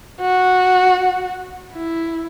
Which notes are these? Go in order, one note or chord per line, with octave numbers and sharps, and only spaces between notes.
F#4
E4